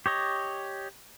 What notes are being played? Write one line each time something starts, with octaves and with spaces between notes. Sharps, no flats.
G4 C#5 D#5